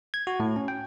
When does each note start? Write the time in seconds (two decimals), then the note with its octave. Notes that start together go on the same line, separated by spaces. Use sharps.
0.14 G#6
0.27 F#4
0.40 A2
0.56 C#4
0.68 G5